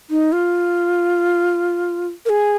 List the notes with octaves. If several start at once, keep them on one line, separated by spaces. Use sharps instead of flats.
D#4
F4
A#4
G#4